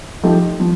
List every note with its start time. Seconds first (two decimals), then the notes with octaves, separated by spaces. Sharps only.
0.23 F3 A3 D#4 G4
0.60 F3